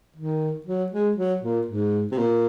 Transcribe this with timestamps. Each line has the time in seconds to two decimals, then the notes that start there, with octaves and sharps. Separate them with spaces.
0.16 D#3
0.66 F#3
0.92 G#3
1.17 F#3
1.42 A#2
1.67 G#2
2.12 C3
2.18 A#2